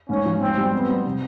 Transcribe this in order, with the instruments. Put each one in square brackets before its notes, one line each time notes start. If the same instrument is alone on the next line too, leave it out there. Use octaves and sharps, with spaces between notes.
[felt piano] G#2 [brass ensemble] C#4
[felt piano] F3
[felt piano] G#2 [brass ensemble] C4
[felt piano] G3
[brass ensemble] B3 [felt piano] C4
[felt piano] G3
C3